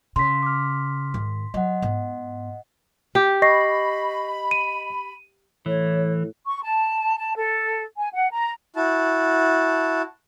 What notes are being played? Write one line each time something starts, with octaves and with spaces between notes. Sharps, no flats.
C#3 C6 B6
D6 F6
G#2 D#3
F#3 D#5 F#5
G#2 B3
G4
D#5 B5 C#6 A#6 C7
D#7
A2 E3 C#5
C#6
A5
A5
A4
G#5
F#5
A#5
E4 F#4 A5